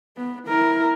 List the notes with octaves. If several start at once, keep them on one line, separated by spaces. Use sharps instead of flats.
B3
E4 A#4